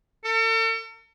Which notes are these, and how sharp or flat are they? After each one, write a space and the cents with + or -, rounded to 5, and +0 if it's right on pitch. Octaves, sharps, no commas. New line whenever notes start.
A4 +45